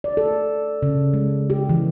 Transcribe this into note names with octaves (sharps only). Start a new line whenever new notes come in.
D5
A4
C#3
G#3
G4
E3